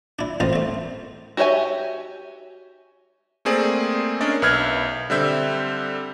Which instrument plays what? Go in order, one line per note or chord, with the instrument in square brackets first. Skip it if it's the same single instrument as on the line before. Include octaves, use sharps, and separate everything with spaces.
[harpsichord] D4 E4
A1 F4 C5 D#5 A5
A3 C4
[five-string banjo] F#4 G4 C#5 E5 G#5
[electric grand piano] A3 A#3 C4 G#4 D5
C#4 D4 A#4 D5 D#5
B1 B4 E5 F6 G#6
D3 G3 C4 E5 G6